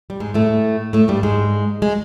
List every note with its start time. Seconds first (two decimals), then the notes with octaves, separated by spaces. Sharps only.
0.10 G3
0.20 G#2 G#3
0.34 A2 A3
0.93 A2 A3
1.08 G2 G3
1.23 G#2 G#3
1.82 G#3